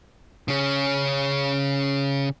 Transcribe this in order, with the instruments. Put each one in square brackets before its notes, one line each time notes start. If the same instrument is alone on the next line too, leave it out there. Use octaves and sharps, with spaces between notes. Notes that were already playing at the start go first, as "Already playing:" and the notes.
[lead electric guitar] C#3 C#4